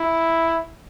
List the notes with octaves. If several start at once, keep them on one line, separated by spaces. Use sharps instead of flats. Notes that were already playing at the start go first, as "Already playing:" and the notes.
Already playing: E4